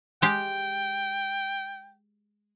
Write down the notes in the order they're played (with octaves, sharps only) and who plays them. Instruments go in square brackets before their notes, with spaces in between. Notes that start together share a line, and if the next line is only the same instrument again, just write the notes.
[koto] G#3 G4 [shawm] G5